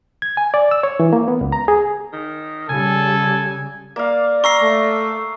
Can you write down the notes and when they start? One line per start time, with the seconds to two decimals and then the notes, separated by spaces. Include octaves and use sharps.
0.22 G#6
0.37 G#5
0.54 D5
0.71 E6
0.83 C#5
1.00 E3
1.13 A#3
1.28 B3
1.41 C#2
1.52 A#5
1.68 G#4
2.13 D#3
2.69 C#3 G3 A4 G#5
3.96 A#3 D5 F5
4.44 A#5 C#6 E6 C7
4.62 A3